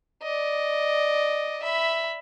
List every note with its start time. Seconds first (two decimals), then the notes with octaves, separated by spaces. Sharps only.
0.23 D5 D#5
1.63 E5 B5